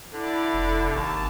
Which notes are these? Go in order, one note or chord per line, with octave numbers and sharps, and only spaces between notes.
D3 E4 D5
F1
G#1 D#2 A5